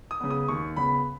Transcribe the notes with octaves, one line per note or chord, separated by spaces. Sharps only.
D#6
C#3 B3
D#6
D#2 C#6
C#3 B3 B5